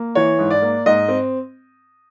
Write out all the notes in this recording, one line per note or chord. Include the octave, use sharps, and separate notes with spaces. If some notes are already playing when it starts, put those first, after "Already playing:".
Already playing: A#3
E3 C#5
G#2
D5
A#3
G#2 D#5
C4